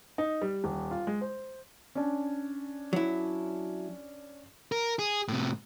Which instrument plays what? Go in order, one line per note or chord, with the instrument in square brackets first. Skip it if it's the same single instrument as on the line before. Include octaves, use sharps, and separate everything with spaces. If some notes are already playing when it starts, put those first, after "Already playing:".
[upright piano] D#4
G3
D#1
F4
G#3
C5
[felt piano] C#4 D4
[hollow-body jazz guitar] F#3 E4
[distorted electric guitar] A#4
G#4
A2 C3